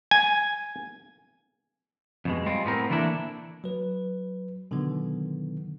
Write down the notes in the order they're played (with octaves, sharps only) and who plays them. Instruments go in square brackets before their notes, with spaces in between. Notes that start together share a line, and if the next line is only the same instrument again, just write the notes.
[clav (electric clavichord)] G#5
[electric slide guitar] F2 B2 G#3
G3 G#3 C4 F4
A2 B3 C4 A#4
D3 E3 A3 A#3 D4 E4
[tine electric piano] F#3 B4
B2 D3 D#3 F#3 B3